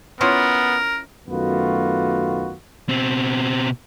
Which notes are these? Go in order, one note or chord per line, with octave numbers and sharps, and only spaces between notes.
B3 C#4 E4 F4 A#4
F#2 D#3 A3 B3 F4 F#4
B2 C4